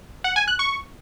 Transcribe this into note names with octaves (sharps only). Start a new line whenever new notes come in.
F#5
G#5
F#6
C#6